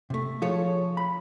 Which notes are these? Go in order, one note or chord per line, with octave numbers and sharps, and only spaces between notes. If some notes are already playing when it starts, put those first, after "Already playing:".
C3 A3
F3 G#4 A4 C#5
B5